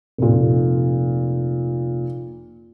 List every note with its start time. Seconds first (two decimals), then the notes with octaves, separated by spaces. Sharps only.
0.18 F1 A#2